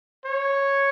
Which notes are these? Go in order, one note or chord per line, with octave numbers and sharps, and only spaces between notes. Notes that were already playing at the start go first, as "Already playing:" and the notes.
C#5